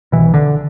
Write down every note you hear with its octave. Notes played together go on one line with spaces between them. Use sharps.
C2 B2 E3
D3